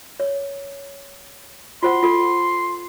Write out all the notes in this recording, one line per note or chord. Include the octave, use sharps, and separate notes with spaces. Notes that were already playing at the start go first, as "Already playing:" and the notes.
C#5
F4 C5 F#5 C6
F4 A4